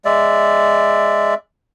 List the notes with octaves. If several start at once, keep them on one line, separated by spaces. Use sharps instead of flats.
G#3 D5 E5